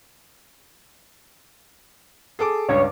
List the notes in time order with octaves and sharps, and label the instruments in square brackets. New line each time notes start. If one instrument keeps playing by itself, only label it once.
[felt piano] G#4 A4 D6
[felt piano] C#2 G2 [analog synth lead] C#5